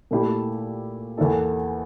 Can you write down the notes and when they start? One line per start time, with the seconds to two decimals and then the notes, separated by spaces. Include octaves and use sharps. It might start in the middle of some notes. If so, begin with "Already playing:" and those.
0.11 A#2 A3 E4 G4
1.18 E2 E3 A#3 E4 A4